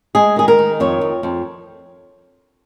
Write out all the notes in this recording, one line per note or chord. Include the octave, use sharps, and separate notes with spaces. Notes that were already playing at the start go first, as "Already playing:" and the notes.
G#3 G#4
D#3 G#4
A#4
D#3
F2 C#5
F2
F2